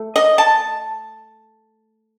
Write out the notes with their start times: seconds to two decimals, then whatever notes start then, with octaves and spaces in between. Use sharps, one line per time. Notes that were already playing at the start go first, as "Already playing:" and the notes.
Already playing: A3
0.16 D#5
0.38 A5